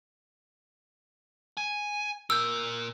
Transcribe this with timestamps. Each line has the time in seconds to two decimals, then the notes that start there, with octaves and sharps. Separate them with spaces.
1.57 G#5
2.30 A#2 A#4 E6 G6